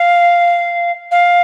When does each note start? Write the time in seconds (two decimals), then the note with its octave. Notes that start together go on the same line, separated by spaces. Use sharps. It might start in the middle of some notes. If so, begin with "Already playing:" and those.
Already playing: F5
1.11 F5